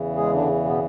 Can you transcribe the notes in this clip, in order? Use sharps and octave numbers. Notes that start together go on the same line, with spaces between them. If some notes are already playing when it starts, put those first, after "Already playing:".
Already playing: E2 C#3 E3
G#3 G#4
D3 D4
B2 B3